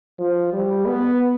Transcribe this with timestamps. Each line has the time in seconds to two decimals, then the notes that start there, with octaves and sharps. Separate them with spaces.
0.19 F3
0.53 G3
0.86 B3